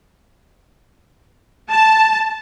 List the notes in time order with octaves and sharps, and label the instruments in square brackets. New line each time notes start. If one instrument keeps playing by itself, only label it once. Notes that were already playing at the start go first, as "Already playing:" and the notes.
[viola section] A5